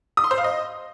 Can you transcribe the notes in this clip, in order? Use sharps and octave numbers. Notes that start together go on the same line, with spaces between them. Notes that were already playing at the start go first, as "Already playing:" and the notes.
D#6
C6
C5
F5
D#5